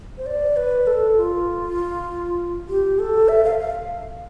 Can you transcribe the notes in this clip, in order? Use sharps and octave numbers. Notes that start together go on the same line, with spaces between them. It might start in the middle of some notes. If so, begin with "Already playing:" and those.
C5
D5
B4
A4
F4
G4
A4
E5
F5
F5